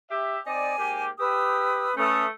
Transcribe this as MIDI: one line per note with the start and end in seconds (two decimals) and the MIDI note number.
0.10 0.38 67
0.10 0.38 76
0.46 0.77 60
0.46 0.77 63
0.46 0.77 74
0.46 1.03 80
0.78 1.09 44
0.78 1.09 58
0.78 1.09 67
1.19 1.87 67
1.19 1.97 71
1.19 1.97 87
1.19 1.97 88
1.97 2.29 57
1.97 2.24 61
1.97 2.24 71
1.97 2.24 87